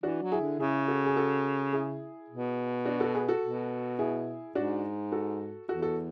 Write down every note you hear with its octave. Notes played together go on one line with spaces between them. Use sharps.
E3 D4 F#4
F#3
E4 G#4
D3
C#3 E4 G#4
F#4 A4
G#4
F#4 A4
E4 G#4
B2
D4 F#4
F#4 A4
G#4 B4
F#4 A4
B2
E4 G#4
G#2 D4 F#4
F#4 A4
E2 F#4 A4
F#4 A4